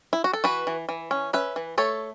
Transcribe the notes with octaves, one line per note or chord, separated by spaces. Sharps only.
E4
F#4
A4
E3 F#4 B4
E3
E3
C#4
C#4 B4 E5
E3
A3 A4 C#5